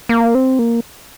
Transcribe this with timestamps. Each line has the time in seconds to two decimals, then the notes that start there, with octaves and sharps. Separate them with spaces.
0.09 A#3
0.35 C4
0.59 A#3